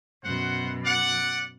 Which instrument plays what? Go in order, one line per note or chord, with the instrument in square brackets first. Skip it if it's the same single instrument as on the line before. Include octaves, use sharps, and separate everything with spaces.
[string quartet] F#2 B2 [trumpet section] C5 F#5
[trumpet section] D5 F#5